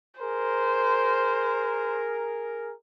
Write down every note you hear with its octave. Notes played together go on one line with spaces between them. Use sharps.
G#4 A#4 C5